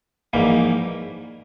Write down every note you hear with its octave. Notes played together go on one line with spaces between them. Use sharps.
A#1 G#2 E3 G3 A#3